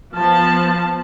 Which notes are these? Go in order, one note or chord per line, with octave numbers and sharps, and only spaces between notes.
F3 B3 A5